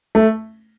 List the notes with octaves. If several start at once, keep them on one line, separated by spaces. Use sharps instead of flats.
A3